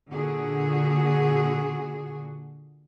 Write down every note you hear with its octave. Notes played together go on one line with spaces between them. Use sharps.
A#2 D3 F#4 G#4